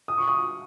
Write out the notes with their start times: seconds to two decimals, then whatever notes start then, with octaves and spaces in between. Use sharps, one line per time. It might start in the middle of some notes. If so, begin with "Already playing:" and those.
0.08 D#6
0.18 C#6
0.28 D#6